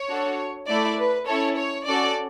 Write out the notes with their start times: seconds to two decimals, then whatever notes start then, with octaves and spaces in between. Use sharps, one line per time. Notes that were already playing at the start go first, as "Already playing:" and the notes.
Already playing: C#5
0.09 D4 F#4 A4
0.68 A3 E4 A4 D5
0.97 B4
1.28 C#4 E4 A4 C#5
1.57 C#5
1.87 C#4 F#4 A4 D5